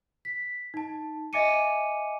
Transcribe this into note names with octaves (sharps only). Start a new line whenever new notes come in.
B6
D#4 A5
D#5 E5 G#5 D6 C#7 D#7